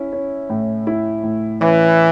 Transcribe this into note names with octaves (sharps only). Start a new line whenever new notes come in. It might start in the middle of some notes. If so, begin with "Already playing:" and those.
Already playing: C#4 E4
C#4
A2
E4
A2
E3 C#4